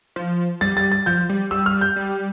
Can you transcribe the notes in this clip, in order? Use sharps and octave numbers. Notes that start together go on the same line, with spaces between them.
F3
G3 A6
A6
A6
F3 G6
G3
G3 E6
F6
G6
G3